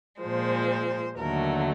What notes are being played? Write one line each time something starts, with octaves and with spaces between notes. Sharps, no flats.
A#2 F3 G#3 C5
D#2 D3 F#3 A3 A#4